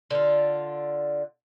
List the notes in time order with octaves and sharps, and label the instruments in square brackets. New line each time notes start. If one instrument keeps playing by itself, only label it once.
[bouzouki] D3 F4